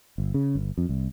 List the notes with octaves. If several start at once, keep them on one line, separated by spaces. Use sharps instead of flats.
G1
C#3
G1
F2
C2